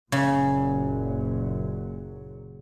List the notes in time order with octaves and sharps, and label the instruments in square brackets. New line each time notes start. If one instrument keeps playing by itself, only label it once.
[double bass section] F#1 A#2 F#3 [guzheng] C#3